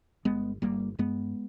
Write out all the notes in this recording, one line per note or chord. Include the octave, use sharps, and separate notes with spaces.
G1 G#3 B3
G1 G3 A#3
G2 G#3 B3